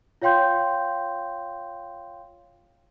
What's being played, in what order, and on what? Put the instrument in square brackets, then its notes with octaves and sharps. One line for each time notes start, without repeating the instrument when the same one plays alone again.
[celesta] F4 C#5 F5 G5 C6 G6